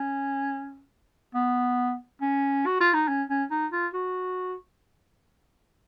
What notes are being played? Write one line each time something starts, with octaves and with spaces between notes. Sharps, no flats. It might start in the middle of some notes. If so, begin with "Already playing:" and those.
Already playing: C#4
B3
C#4
F#4
F4
D#4
C#4
C#4
D#4
F4
F#4